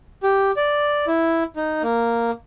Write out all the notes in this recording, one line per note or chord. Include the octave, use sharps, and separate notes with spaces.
G4
D5
E4
D#4
A#3